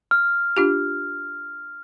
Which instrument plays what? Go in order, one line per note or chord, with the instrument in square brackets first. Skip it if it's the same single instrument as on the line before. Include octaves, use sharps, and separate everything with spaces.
[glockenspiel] F6
[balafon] D4 F4 G4